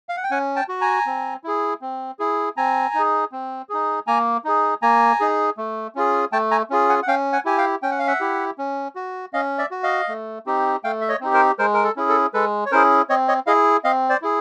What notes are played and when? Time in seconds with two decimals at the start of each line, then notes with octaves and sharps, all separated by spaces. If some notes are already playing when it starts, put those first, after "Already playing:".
0.09 F5
0.17 F#5
0.24 G5
0.31 C#4 F#5 G#5
0.56 G5 A5
0.69 F#4
0.81 G#5 A#5
1.06 C4
1.44 E4 G#4
1.81 C4
2.19 E4 G#4
2.57 C4 G#5 A#5
2.94 D#4 G#4
3.32 C4
3.69 D#4 G#4
4.07 A#3 G#5 A#5
4.44 D#4 G#4
4.82 A#3 G#5 A#5
5.20 D#4 G#4
5.57 A3
5.95 C#4 F4 G#4
6.32 A3 G5 A5
6.51 G#5 A#5
6.70 C#4 F4 G#4
6.89 F#5 G#5
7.02 F#5
7.08 C#4 F5 G5
7.32 F#5 G#5
7.45 E4 G4 G#5
7.58 F5 G5
7.82 C#4 G5
7.91 F#5
7.99 F5
8.07 E5 F#5
8.21 E4 G4
8.58 C#4
8.95 F#4
9.33 C#4 D#5 F5
9.58 D5 E5
9.71 F#4
9.83 D#5 F5
10.09 A3
10.46 C4 D#4 G4
10.84 A3 F5 G5
11.01 E5
11.09 C#5 D#5
11.21 C4 D#4 G4
11.34 A#4 C5
11.59 G#3 A#4 C5
11.74 A#4
11.84 A4
11.96 C#4 E4 G#4
12.09 A4
12.34 G#3 A4 B4
12.66 C#5
12.72 C#4 E4 G#4 A#4 C5
13.09 C4 C#5 D#5
13.28 C#5 D#5
13.47 E4 G#4 D#5 F5
13.84 C4 D#5 F5
14.10 C5 D5
14.22 E4 G#4